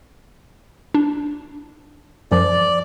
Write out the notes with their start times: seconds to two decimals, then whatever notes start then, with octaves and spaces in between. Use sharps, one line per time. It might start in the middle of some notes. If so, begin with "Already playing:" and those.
0.94 D4
2.32 F#2 F3 D5